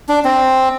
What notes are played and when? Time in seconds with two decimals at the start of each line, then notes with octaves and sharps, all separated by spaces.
0.09 D4
0.25 C4